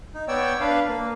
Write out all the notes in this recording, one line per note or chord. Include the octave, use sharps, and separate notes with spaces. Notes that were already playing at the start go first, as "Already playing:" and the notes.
D#4
B3 C#5 D5 G5 E6
D4 B4 F5
A#3